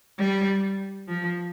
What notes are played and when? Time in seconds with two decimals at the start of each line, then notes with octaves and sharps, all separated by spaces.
0.19 G3
1.08 F3